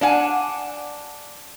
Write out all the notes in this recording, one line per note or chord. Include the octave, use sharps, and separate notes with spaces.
D4 F5 F#5 G#5